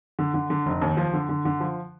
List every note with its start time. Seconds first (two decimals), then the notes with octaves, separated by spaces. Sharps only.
0.19 D3
0.34 D3
0.50 D3
0.66 F1
0.82 D#2
0.97 F3
1.13 D3
1.29 D3
1.45 D3
1.60 F3